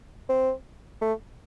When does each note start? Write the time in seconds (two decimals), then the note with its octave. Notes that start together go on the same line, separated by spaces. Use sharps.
0.29 C4
1.02 A3